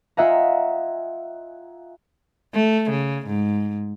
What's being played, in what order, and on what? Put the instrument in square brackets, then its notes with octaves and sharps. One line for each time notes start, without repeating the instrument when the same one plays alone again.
[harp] F4 D#5 E5 F#5 G#5 A#5
[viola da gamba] A3
C#3
G#2